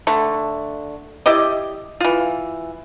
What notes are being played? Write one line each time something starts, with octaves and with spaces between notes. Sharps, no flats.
D3 A3
E4 G4 D5 D#5
E3 F4